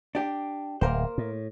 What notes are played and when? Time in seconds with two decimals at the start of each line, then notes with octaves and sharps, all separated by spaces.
0.15 D4 G4
0.81 D1 A#3 A#4 C5
1.18 A2